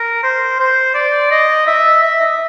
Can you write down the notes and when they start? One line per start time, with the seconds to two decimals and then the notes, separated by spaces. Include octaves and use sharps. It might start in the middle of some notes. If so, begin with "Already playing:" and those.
Already playing: A#4
0.23 C5
0.60 C5
0.94 D5
1.31 D#5
1.67 E5
2.03 E5
2.21 D#5